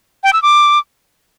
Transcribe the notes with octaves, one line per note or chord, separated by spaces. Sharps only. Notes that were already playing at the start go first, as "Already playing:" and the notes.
G5
E6
D6